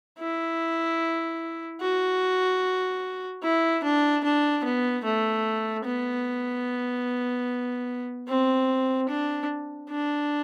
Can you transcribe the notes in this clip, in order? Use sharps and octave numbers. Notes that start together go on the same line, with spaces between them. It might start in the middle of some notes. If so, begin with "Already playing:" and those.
E4
F#4
E4
D4
D4
B3
A3
B3
C4
D4
D4